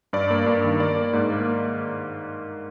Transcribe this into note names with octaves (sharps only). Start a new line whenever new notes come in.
G2 D5
A#3
G2
D#3
A#3 D5
A#3
G#2
A#3